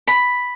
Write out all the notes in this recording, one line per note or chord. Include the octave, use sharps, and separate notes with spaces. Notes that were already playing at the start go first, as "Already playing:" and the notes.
B5